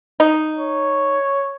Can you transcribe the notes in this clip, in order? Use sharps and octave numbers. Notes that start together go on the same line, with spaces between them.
D#4
C#5